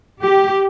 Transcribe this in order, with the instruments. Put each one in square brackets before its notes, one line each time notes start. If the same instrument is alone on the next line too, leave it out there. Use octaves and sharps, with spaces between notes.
[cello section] G4